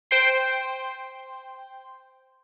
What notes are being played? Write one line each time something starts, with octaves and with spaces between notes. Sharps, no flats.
C5 G5 C6